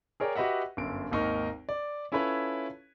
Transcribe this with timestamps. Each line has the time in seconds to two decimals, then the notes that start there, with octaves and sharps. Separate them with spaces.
0.20 G#4 A#4 C#5 D5 G5
0.36 F#4 G4 B4 D#5 E5 F#5
0.77 G1 F#2 D7
1.11 G#1 D#2 D#4 A#4 C#6
1.69 D5
2.12 C#4 E4 F4 A4 B4 C#5